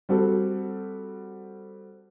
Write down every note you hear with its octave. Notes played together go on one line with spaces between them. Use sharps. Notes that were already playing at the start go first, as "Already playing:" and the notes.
G3 C4 F#4 A4